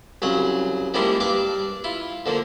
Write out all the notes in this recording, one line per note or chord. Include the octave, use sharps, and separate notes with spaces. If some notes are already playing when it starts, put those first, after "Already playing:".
C2 C#3 F#3 C#5 F#5
F3 G3 G#3 A#3 D4 E4
G2 D4 D5 A5
E4 F4
D3 F3 A#3